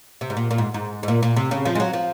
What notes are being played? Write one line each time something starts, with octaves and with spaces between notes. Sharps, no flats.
C3
G#2
A#2
A#2
G#2
G#2
G#2
A#2
A#2
C3
C#3
F3
G#3
F#3
F3